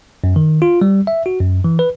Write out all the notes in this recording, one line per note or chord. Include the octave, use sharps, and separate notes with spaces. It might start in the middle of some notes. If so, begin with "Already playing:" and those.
F#2
D#3
F4
G3
E5
F#4
F#2
E3
B4